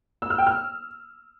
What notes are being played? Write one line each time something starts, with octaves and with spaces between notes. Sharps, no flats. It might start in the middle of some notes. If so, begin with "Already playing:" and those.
E6
F6
G5
F6